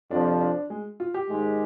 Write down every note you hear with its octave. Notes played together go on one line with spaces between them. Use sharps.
F2 C3 F3 D4
D4
G#3
F4
G4
G#2 D#3 G#3